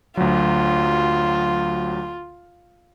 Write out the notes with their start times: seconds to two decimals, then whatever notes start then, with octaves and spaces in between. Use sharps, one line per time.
0.17 D2 F#3 F4